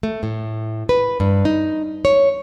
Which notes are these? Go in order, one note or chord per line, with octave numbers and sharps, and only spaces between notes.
A3
A2
B4
G2
D#4
C#5